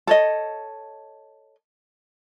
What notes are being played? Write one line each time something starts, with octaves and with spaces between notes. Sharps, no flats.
A4 C#5 D#5